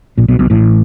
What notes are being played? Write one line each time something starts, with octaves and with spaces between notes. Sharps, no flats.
A#1 A#2
B1 B2
B1 B2
A1 A2